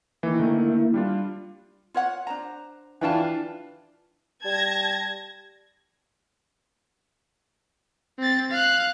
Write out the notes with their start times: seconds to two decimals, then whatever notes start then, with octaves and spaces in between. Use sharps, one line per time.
0.23 D#3 E3 A#3 E4
0.39 D3 D#3 A3
0.94 G3 D4 F4
1.94 F4 C#5 F#5
2.27 D4 C5 A#5
3.01 E3 D4 F4 G4 G5 A5
4.45 G3 A5 G#6 A#6
8.19 C4 A6
8.51 F5 F#6